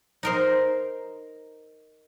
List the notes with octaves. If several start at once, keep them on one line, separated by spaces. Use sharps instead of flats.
D#4 A#4 C5